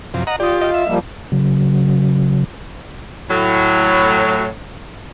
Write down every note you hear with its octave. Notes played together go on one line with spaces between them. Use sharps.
F#2 C3 F3
D#5 F#5 A#5
F4 G4 D5 D#6
D#5 F5
E5
F3 G3 A#3
C#3 F#3
A2 F#3